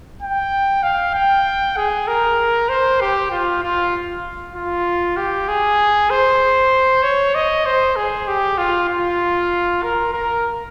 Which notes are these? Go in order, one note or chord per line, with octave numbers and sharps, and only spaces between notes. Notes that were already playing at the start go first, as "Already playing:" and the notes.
G5
F5
G5
G#4
A#4
C5
G4
F4
F4
F4
G4
G#4
C5
C#5
D#5
C5
G#4
G4
F4
F4
A#4
A#4